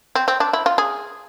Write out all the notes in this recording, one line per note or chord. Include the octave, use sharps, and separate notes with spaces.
C4
C4
D4
E4
F4
G#4